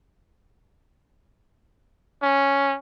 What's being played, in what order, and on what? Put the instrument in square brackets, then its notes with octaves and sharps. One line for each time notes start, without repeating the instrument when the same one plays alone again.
[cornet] C#4